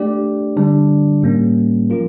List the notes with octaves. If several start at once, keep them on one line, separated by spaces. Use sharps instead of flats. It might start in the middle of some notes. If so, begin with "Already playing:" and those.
Already playing: A3 D4 G4 D5
D3 G3 D4
A2 G3 A#3 C#4
F3 C#4 F4 A#4